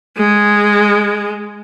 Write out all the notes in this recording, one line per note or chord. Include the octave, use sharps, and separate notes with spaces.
G#3